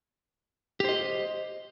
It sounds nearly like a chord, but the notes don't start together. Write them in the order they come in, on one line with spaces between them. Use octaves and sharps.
G4 C5 D#5